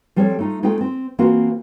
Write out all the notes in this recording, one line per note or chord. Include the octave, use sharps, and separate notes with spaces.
F3 G3 C4 G4 A4 C#5
A3 D#4 F4
G#3 A3 C4 D#4 F4 G5
C4
E3 A#3 C4 F4 F#4 A#4